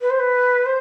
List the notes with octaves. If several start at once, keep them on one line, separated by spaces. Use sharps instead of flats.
B4
C5
B4
C5